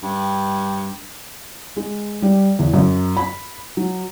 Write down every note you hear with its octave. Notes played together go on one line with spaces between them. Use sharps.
G2
G#3
G3
E2
F#2
B5
F#3